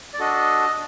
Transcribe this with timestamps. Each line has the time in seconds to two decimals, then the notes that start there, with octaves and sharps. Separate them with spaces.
0.13 D5
0.19 D4 F#4 A4 D#5